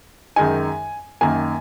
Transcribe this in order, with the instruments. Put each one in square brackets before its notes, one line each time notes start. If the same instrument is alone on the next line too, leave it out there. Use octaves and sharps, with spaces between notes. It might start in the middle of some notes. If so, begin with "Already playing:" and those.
[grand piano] F#2 D#3 G#3 D#4 G#5
F#2 D#3 A#3 G#5